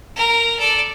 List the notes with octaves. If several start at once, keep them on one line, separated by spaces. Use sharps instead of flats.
A#4 A#5
A4 D5